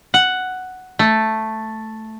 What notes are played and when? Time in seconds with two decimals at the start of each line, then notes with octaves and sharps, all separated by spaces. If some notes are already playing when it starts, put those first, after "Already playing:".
0.14 F#5
0.99 A3